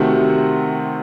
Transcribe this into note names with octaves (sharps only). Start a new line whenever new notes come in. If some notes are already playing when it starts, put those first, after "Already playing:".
Already playing: C3 D#3 A3 C4 F#4